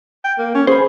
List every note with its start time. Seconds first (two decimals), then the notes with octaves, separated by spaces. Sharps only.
0.24 G5
0.38 A#3
0.55 C#4
0.67 G#4 C5 B5